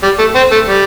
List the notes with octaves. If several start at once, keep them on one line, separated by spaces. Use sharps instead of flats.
G3
A3
C4
A3
G3